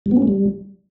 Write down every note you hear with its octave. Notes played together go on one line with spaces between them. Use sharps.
G3
B3
C#4
A3
G3